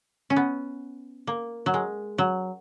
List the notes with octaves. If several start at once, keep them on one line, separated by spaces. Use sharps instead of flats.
C#4
B3
A#3
F#3
G#3
F#3